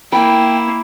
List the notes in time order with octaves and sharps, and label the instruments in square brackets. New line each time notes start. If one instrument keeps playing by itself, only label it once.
[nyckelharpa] A#3 E4 [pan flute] G5 [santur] B5